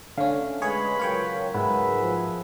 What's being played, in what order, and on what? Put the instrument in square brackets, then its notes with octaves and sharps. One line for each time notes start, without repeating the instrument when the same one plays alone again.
[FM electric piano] D3 C#4 [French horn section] A3 [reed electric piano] F5
[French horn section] G#3 [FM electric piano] G#4 C#5 [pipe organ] B4 B5
[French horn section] C#3 F#3 A#4 [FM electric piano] F4 C#5 G5
[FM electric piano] G#2 [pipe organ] G#4 B4 E5 [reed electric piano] F#5 B5
[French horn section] F3